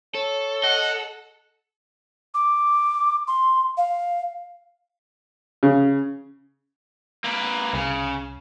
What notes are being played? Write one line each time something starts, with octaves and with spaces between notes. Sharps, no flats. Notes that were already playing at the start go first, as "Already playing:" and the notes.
A4 C#5
D#5 F#5
D6
C6
F5
C#3
A#3 B4
C2 C#3